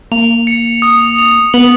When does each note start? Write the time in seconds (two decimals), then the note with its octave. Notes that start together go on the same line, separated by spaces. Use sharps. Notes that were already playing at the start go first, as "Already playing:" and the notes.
0.12 A#3 F7
0.47 C#7
0.82 D#6
1.18 F7
1.54 B3 F#7